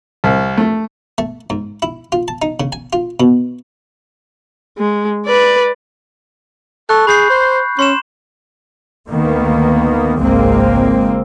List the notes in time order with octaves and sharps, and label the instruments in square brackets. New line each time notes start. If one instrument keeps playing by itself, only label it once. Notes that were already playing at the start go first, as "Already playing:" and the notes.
[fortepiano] C2
A3
[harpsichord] A3
G#2
E4
F4
A5
D#4
C#3
G#5
F4
B2
[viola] G#3
B4 D5
[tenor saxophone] A4 [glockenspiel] C#6 F#6
[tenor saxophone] G#4 [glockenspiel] B5 G6 C7
[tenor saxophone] C5
[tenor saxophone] C#4 [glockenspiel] C6 E7
[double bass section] D2 D#3 A#3 B3
G#1 C#2 G#3 A#3 C4